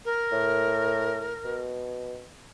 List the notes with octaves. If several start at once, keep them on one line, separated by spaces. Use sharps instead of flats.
A#4
A2
B2